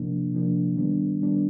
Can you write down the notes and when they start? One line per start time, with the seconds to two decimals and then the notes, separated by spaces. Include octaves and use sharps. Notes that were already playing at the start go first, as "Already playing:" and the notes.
Already playing: C3 F3 A#3 D4
0.32 C3 F3 A#3 D4
0.76 D#3 G3 B3 D4
1.21 D#3 G3 B3 D4